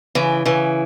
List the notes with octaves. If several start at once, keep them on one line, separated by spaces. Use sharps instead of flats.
C#3 E3
C#3 E3